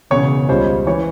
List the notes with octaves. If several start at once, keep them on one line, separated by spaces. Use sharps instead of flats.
E1 E2 C#3 C#5
C#2 C#3 G3 C#4 F4 C5
E3 C#5